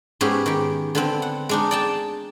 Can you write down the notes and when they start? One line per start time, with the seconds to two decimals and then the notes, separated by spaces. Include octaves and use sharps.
0.21 G#2 B3 C#4 G4 G#4
0.46 D#3 G4
0.95 D3 B3 C4
1.22 F#5
1.49 G#3 D4 D#4
1.71 D5 G5 A5